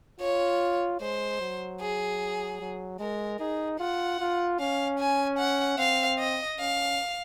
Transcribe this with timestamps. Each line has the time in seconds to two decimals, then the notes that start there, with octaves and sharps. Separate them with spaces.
0.21 F4 C#5
1.01 G#3 C5
1.41 F#3
1.80 G#4
2.60 F#3
2.99 G#3 A#4
3.40 D#4 G#4
3.79 F4 F#5
4.20 F4
4.60 C#4 F5
4.99 G#5
5.38 F#5
5.78 C4 F5
6.18 D#5
6.58 C#4 F5